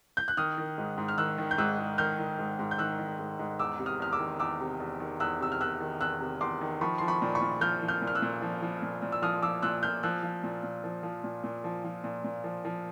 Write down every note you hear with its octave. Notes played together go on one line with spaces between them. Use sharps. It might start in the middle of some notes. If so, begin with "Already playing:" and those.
G6
F#6
D#3 D#6 F6
D#3
G#2
G#2
F6
D#3 E6 F#6
D#3
G6
G#2 E6 F#6
G#2
D#3 F6 G6
D#3
G#2
G#2
G6
D#3 E6 F#6
D#3
G#2
G#2
E2 D6 E6
C3
D#6 F6
E2 F6
D6 E6
D#3
E2 D6 E6
C3
E2
D#3
E2 E6 F#6
C3 E6
F6
E2 E6 F#6
D#3
E2 E6 F#6
C3
E2 C6 D6
D#3
F3 B5 C#6
F3 C6
B5 C#6
A#2
B5 C#6
A#2
F3 F6 G6
F3
F6 G6
A#2
F6
E6 F#6
A#2
F3
F3
A#2
A#2
E6
F3 D#6 F6
F3 D6 E6
A#2 E6 F#6
A#2 F6 G6
F3 E6 F#6
F3
A#2
A#2
F3
F3
A#2
A#2
F3
F3
A#2
A#2
F3
F3